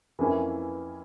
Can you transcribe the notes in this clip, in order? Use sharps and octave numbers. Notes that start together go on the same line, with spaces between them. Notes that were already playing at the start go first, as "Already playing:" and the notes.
F2 E3 A#3 C#4 E4